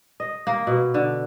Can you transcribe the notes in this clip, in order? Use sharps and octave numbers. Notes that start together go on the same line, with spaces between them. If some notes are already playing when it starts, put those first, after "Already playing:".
D#5
A#3
B2
D3